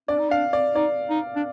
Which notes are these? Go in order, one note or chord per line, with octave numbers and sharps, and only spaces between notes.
D4 D5
D#4
D4 F5
D5
D#4 D5
D#4
D4